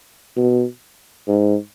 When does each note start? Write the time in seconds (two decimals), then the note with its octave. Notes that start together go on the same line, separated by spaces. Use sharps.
0.37 B2
1.28 G#2